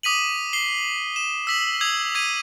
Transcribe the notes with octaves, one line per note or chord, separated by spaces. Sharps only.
D6 D#6 B6 D#7 F#7
C7 G7
E7
E6 B6 F#7
D#6 E6 G#6 F#7
D6 G#6 B6 D#7